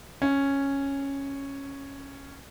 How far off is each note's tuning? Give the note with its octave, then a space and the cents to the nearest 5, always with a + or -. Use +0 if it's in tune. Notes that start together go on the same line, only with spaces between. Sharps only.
C#4 -5